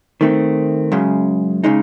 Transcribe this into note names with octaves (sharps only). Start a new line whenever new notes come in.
D#3 A3 C4
F#2 C#3 G#3
C#3 G#3 D#4